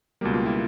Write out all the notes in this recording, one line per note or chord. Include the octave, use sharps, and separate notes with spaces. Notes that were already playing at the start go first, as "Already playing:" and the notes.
C#2 B2 G3 A#3
F4
E4